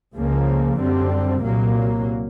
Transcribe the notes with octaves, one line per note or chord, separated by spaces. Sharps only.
C#2 C#3 F3 A#3
F#2 D3 G3 C4
C2 A#2 F#3 A#3